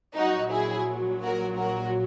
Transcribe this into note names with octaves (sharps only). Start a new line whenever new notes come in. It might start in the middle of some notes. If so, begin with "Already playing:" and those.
A#1 A#2 F#3 D#4 F#4
E4 G#4
F#4 A#4
F#4 A#4